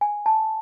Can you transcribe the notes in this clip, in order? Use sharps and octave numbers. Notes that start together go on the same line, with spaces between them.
G#5
A5